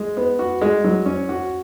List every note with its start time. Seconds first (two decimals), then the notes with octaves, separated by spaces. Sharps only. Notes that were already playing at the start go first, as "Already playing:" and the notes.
Already playing: G#3
0.17 B3
0.39 F#4
0.61 G#3
0.84 F#3
1.06 C#4
1.29 F#4